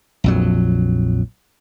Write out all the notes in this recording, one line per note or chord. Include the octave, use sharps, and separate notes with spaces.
A#1 F2 F#3